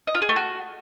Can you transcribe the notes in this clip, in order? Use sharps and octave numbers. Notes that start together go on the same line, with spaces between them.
D#5
F4
G#4
A3
F#4